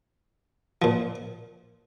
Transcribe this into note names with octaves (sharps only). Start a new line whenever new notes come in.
A#2 F3